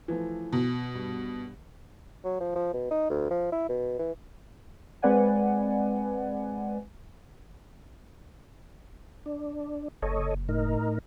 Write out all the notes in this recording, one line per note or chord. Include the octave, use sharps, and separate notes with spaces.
E3 F3 A3
B2
G2
F#3
F3
F3
B2
D#4
D2
F3
E4
B2
E3
G#3 C4 B4 D5 F#5 G#5
D4
F#1 A4 C#5 D#5
A2 D#4 A#4